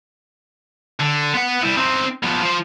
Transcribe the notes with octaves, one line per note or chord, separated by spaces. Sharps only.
D3
B3 F#5
G3 E4
C4 D#4
F3 B3
F3 C5